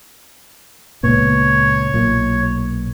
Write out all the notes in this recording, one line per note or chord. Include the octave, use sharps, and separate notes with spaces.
C#2 A#2 B3 C#5
B1 A#2